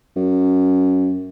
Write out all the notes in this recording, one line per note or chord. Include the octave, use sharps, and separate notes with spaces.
F#2